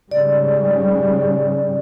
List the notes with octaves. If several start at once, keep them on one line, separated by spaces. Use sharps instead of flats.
G#2 C#3 G3 D5